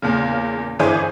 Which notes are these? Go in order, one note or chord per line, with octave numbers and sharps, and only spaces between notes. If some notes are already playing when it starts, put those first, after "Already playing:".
E2 A#2 C#3
G1 E3 G#4 C5 G#5 D6